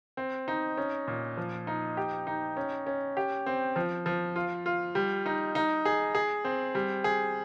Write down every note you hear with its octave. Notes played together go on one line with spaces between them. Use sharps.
C4
D#4
C#4
A#2
F3
D#4
G4
D#4
C#4
C#4
G4
C4
F3
F3
F4
F4
G3
D#4
D#4
G#4
G#4
C4
G3
G#4